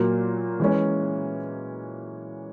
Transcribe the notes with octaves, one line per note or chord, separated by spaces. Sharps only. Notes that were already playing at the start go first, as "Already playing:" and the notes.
Already playing: A#2 F#3 A#3
E3 G#3 C#4